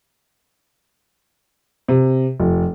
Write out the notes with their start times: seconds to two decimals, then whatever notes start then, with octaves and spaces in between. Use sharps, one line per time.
1.88 C3
2.40 F1